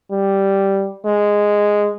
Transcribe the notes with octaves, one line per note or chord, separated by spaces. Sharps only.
G3
G#3